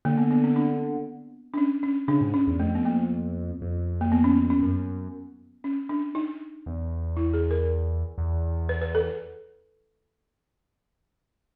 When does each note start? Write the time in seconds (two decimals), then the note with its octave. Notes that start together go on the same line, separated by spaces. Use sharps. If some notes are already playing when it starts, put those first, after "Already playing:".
0.05 D3 A#3
0.18 B3
0.31 B3
0.44 C4
0.56 D4
1.54 D4
1.57 C#4
1.83 C#4
2.08 C#3 D4
2.21 G#2
2.34 C#4
2.47 E2
2.60 F2 A3
2.75 B3
2.85 A#3
3.62 F2
4.01 A#3
4.12 B3
4.24 C#4
4.50 C#4
4.62 F#2
5.64 C#4
5.89 D4
6.15 D#4
6.66 E2
7.17 E4
7.34 G#4
7.51 A#4
8.18 E2
8.69 B4
8.82 B4
8.95 A4